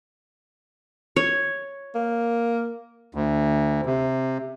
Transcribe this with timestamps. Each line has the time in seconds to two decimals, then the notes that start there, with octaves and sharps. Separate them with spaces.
1.16 C#5
1.95 A#3
3.15 D2
3.86 C3